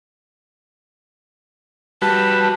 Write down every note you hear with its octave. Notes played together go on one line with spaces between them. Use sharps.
G3 F#4 B4 A5